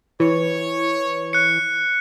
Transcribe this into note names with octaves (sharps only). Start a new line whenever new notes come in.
E3 C#5
F#6 C#7